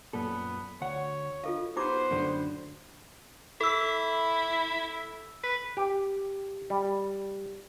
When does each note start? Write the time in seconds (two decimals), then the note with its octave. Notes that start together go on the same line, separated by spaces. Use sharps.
0.13 F#2 A#2 B3 A4
0.81 D2 C#5 F#5
1.44 F4 A4 D#5 F5
1.77 B3 D#4 G4 C5 A#5 D6
2.11 F#2 A2 D3
3.61 E4 A4 E6
5.44 B4
5.77 G4
6.70 G3